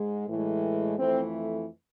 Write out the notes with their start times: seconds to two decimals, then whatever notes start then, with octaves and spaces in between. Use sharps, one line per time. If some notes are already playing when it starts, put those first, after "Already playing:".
Already playing: G#2 G#3
0.28 A2 E3 G#3
0.98 F2 E3 A3 C4